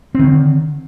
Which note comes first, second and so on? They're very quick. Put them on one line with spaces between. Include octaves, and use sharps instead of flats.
C4 D#3 D3